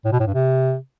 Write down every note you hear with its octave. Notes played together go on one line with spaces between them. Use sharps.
A2
B2
A2
G2
C3